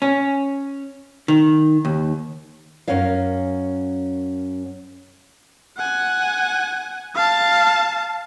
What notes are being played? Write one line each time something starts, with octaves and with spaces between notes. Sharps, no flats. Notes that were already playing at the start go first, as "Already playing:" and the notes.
C#4
D#3
D#2
F#2 C#4 A#4 C#5 F5
F#5 G#5
F5 A5